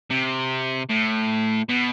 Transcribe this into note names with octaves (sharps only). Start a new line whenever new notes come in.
C3
A2
B2